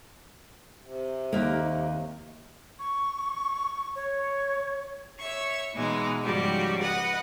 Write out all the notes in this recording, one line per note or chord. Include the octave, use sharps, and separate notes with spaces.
C3
D#2 A#3
C#6
C#5
C#5 E5 C#6
B2 E3 G#3 D#4
G#2 C#3 F3 G3 F#4 G4
B4 D#5 F#5